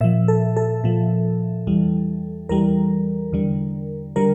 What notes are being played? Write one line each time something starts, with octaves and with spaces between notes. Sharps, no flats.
A#2 F3 E5
A4
A4
A#2 F3
E2 E3 G3
E2 E3 G3 A#4
E2 D3 G3
D3 G3 A#4